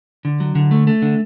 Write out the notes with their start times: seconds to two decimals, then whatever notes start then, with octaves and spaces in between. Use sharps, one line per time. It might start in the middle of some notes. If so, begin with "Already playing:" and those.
0.25 D3
0.40 F#3
0.55 D3
0.71 A3
0.87 A3
1.02 D3